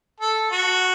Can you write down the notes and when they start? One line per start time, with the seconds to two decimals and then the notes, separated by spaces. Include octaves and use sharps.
0.20 A4
0.51 F#4